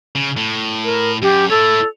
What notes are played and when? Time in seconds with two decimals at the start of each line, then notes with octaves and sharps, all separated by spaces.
0.15 C#3
0.37 A2
0.84 A#4
1.22 F#2 G4
1.50 E4 A4 C#5